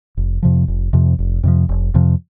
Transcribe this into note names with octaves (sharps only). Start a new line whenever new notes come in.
F1
F2 C3 F3
F1
F2 C3 F3
F1
F2 C3 F3
F1
F2 C3 F3